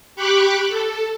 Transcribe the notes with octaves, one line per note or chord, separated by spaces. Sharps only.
G4 B5 C#6 D6 F#6
A4